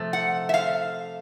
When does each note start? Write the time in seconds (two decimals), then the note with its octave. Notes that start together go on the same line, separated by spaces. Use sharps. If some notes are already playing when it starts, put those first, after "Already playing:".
Already playing: C3 F3 A3
0.13 F#5
0.49 E5
0.54 F5